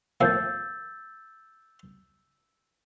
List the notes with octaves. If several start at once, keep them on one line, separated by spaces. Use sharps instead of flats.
D#2 A2 F3 E6 G6 A6